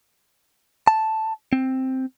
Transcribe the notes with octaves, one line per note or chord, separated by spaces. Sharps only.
A5
C4